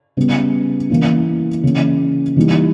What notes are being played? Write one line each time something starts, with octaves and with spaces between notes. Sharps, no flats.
C#3 G3 B3
E3 A#3 C#4 E4
C#3 E3 A#3
E3 G3 A#3 D#4